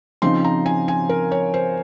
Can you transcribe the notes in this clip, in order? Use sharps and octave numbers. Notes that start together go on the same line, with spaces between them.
C#3 F3 C4 D#4 C6
A#5
G#5
G#5
A#4
C#5
C5